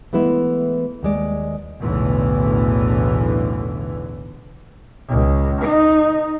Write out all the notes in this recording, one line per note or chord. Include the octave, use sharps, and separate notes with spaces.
E3 G#3 A3 B3 E4
D#2 G#3 D5
B1 E2 A2 D3 E3
C#2
D#4